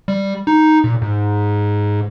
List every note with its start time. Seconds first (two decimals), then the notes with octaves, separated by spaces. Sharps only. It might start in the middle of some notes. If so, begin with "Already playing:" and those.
0.08 G3
0.47 D#4
0.84 A#2
1.02 G#2